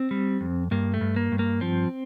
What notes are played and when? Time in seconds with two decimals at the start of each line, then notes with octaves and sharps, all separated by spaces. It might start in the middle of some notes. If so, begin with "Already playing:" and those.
Already playing: C4
0.11 G3
0.41 F2
0.71 G2 A#3
0.94 A3
1.01 G2
1.16 A#3
1.32 G2
1.39 A#3
1.61 F3 C4